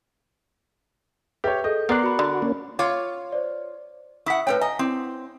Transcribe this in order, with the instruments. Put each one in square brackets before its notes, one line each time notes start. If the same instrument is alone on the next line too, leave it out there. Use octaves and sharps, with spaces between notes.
[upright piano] G4 C#5 [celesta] B4 E5
[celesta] G#4 A4 G6 [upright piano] D#5
[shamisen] B3 [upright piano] A#4 D5 F#6 [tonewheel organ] C6
[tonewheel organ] F#4 [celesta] B5 C#7
[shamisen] D3
[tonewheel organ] A#3 C#4
[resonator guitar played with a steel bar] F4 C#5 F5 [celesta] C6 D6
[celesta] C5 D5
[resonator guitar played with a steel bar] E4 F#5 [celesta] C#6 D#6 B6
[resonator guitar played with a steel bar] A2 C#4 G5 [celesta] B4 C#5
[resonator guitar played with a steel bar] D#5 [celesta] G#5 A#5
[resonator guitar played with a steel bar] C4 [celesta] E4 D6